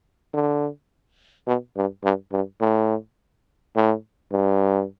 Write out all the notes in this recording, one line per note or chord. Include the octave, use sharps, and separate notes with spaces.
D3
B2
G2
G2
G2
A2
A2
G2